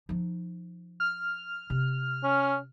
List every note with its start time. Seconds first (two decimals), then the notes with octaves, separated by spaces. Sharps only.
0.09 F3 D#4
1.00 F6
1.70 C3
2.24 C#4